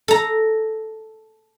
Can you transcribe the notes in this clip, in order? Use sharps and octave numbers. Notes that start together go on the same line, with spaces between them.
A4 A#5